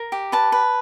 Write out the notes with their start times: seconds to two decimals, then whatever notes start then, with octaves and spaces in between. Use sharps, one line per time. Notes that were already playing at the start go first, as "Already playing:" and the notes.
Already playing: A#4
0.12 G4
0.32 B4 A5
0.52 B4